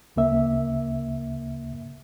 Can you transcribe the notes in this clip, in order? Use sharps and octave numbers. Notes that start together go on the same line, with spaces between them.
D2 C#3 A#3 E5